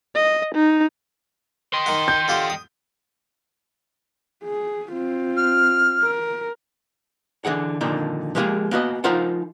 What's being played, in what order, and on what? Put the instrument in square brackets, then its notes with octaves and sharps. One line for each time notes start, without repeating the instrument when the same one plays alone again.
[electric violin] D#5
D#4
[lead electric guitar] D#5 G5 [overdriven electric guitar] C6
[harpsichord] D#3 F#5
[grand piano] G6
[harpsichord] D3 F4 G4
D#6
[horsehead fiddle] G#4
C4 F4
[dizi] F6
[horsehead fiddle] A#4
[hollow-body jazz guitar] D3 E3 G#4 F#5
F2 A#2 D3 D#3 D4
F3 G#3 A#3 D#4 G4 G#4
A#3 B3 F#4 D#5
F3 D#4 F4 A#4 C5 F#5